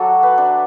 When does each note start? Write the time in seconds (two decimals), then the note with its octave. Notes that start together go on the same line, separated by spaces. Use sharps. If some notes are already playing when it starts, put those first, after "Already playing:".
Already playing: F#3 A3 D4 F#4 A4
0.23 B4
0.38 D4